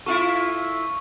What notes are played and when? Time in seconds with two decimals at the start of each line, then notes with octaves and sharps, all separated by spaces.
0.06 E4 F4 A4 C#6